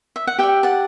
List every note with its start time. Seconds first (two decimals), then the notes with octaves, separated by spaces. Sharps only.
0.16 E5
0.27 F#5
0.39 G4 D5 E5 G5
0.63 F#5 A5